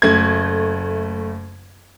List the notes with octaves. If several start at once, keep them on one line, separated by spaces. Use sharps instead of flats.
F#1 A3 G#6